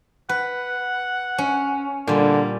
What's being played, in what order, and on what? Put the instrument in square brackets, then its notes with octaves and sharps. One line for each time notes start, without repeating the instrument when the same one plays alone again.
[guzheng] B4 [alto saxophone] F#5
[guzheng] C#4
[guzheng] A#2 G3 [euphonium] D3 [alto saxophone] A#3